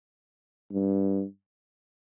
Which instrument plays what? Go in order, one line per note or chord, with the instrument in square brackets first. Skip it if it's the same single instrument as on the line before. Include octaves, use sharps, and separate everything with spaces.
[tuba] G2